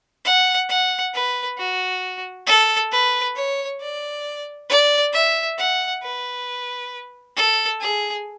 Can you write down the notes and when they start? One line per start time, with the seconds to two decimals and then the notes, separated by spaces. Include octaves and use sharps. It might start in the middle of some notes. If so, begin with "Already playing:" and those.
0.25 F#5
0.69 F#5
1.14 B4
1.57 F#4
2.47 A4
2.92 B4
3.36 C#5
3.81 D5
4.69 D5
5.13 E5
5.58 F#5
6.03 B4
7.36 A4
7.81 G#4